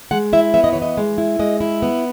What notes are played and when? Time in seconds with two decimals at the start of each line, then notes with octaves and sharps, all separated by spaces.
0.11 G#3 F#5
0.33 E4 E5
0.54 B3 E5
0.64 D#5
0.73 E3 C#5
0.82 D#5
0.97 G#3
1.18 E4
1.39 G#3 D#5
1.61 E4
1.82 B3